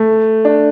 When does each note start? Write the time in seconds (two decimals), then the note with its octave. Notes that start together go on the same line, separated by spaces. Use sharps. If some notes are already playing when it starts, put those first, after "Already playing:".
Already playing: A3
0.45 D4